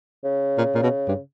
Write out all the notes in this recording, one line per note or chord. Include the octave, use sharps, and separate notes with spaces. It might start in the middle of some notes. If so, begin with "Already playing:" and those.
C#3
A#2
A#2
B2
G2